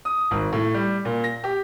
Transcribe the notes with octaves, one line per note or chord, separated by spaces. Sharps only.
D#6
G#1
A2
G3
A#2
A#6
G4